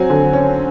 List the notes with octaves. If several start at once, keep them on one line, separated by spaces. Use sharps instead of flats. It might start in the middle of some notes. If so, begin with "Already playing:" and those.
Already playing: F#3 C4 G#5
D3
C#4